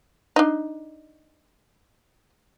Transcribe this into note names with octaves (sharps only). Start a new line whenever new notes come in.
D4 D#4